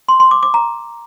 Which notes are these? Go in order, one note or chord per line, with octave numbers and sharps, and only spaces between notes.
C6
C6
D6
D6
A#5